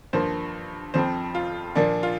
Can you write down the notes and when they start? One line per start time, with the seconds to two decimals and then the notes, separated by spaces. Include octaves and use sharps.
0.13 G2 F3 A#3 C5
0.94 F2 F3 C4 C5
1.35 F4
1.75 A#2 F3 A#3 D4
2.03 F4